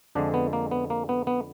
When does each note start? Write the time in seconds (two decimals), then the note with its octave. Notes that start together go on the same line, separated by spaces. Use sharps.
0.15 F2 D3 F3 G#3 D4
0.34 B3
0.53 A#3
0.71 B3
0.90 A#3
1.09 B3
1.27 B3